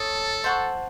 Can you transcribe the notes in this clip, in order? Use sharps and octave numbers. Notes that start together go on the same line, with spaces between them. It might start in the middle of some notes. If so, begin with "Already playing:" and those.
Already playing: A4 C#5 A5 D#6
C5 F#5 A5 C#6